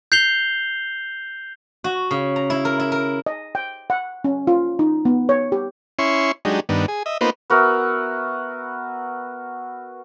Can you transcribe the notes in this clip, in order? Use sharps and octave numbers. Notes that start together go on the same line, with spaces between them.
G6 C7 F7 G7
F#4
C#3
A#5
E4
A#4
E4
A#4
D#5
G5
F#5
C#4
F4
D#4
B3
C#5
G4
C#4 E4 C6 C#6
F#3 G#3 D4 D#4 G4
G2 D#3 B3 D4
G#4
D#5 E5
A#3 B3 D#4 F4 B4 C5
B3 F#4 A#4 E5